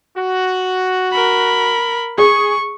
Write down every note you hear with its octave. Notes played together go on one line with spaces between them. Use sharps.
F#4
A#4 B5
G#4 C#6